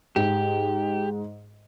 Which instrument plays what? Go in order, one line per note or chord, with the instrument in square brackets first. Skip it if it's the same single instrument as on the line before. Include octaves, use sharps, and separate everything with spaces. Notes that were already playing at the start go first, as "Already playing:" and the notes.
[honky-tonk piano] G#2 [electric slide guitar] G4